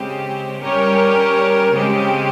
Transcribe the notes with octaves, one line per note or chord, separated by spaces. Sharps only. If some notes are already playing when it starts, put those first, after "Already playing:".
Already playing: C#3 G#3 C4 G4
G3 C#4 G4 A#4 C#5
C#3 G#3 C4 G4